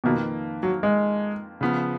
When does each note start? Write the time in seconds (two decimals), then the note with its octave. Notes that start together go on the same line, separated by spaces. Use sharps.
0.04 F2 B2 D#3 A#3 F4 B4
0.63 F#3
0.83 G#3
1.61 C#3 F3 B3